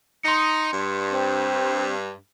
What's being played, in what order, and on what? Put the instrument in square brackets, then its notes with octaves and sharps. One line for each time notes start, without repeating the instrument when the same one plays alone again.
[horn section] D#4 [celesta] C6 C#7
[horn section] G2
[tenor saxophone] C4